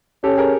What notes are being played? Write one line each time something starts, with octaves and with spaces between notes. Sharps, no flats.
C#4 G4 A4
G#4 A#4